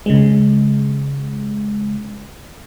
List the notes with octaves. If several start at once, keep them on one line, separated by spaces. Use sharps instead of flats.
C#3 G#3